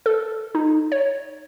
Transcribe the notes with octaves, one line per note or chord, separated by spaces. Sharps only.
A4
D#4
C#5